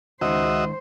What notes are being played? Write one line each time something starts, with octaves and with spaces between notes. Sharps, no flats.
C#2 G#2 D#3 F#4 C5 D#5 E5